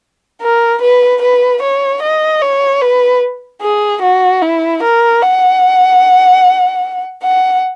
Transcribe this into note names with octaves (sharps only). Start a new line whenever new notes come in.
A#4
B4
B4
C#5
D#5
C#5
B4
G#4
F#4
E4
A#4
F#5
F#5